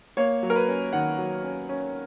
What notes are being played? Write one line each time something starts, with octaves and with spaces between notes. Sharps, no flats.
A#3 C#5
F#3
A#4
B4
C#4
D#3 F#5
F#3
C#4
C#4